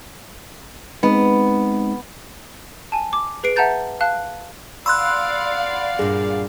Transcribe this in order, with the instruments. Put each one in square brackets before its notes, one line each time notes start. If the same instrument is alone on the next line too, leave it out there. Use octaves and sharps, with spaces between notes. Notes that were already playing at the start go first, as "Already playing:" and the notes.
[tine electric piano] G#3 C4 D#4 [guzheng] B3
[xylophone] G#5 A5
D6
G#4 B4 C7 D7
E5 F#5 A5 A#5 G6 A6
F5 A5 F#6
[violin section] D5 F5 F#5 [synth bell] B5 C6 F#6 [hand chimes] E6
[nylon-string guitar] G2 A#2 [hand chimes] G#4